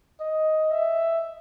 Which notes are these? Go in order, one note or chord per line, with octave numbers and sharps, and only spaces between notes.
D#5
E5